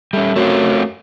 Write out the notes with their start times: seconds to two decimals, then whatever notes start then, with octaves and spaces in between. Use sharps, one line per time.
0.13 G3 A3 C#4
0.36 F#2 A3 C4 F4